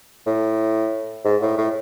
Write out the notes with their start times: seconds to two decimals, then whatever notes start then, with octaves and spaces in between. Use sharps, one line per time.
0.26 A2
1.25 G#2
1.41 A2
1.57 A2